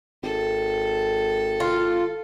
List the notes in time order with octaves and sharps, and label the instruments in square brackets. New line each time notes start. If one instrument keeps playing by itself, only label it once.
[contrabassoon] G#1 [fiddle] A4
[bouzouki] F4